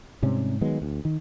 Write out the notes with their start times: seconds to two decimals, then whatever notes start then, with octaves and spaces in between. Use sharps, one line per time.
0.22 G#2 C3 G3 C#4
0.61 D#3 F#3 G#3 B3
0.82 D2
1.05 D#3